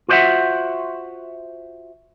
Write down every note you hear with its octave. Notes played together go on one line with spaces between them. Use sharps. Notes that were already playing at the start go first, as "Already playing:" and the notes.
F4 F#4 C5 D5 E5 F#5